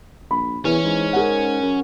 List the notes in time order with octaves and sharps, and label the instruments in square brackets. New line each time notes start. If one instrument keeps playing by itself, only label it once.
[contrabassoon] A#1 [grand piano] B5
[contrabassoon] E2 [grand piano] E3 [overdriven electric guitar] C#4
[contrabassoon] G#2
[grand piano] G#4 A#4 F#5
[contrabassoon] F#2